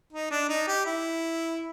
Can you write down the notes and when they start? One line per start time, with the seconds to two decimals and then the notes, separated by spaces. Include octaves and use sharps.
0.13 D#4
0.31 D4
0.49 D#4
0.67 G4
0.85 E4